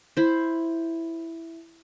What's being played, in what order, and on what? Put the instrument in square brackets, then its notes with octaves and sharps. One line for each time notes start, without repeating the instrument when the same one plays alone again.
[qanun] E4 C5